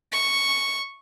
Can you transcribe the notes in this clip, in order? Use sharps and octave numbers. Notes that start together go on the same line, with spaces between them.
C#6